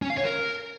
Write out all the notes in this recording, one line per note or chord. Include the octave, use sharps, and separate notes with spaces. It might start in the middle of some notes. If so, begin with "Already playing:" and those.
C#4
F5
C#5
A#4